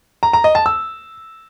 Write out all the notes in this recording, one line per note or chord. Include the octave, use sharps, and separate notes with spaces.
A#5
A#5
D#5
A5
E6